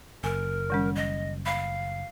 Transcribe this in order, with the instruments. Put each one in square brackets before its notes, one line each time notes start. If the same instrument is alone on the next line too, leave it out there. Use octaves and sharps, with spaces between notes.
[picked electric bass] F#1 [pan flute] A#4 [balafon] G#5
[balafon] D#3 G3 C#4
[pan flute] D#5
[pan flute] F5 [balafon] B5